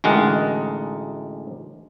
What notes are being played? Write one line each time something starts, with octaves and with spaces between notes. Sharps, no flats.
A1 D2 G#3 D#4 A#4 F#5